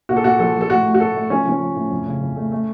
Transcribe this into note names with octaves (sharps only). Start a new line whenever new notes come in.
A#2 F#4
A4
A#2 F#4
F3 A4
F3
A4
A2 F#4
A3
F#4
A2 A4
A3
F3 C#4
F3 C#4
F3
A2
F2
C#3
F2
A3
A3